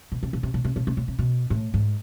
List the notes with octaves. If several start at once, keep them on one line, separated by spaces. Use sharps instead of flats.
B2
C3
B2
C3
B2
C3
B2
C3
B2
C3
B2
A2
G#2